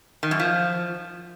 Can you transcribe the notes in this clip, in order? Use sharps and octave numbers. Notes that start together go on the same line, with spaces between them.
D#3
F#2
F3